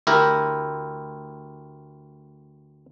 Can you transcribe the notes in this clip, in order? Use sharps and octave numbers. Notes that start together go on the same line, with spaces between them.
D2 E4 G4 A#4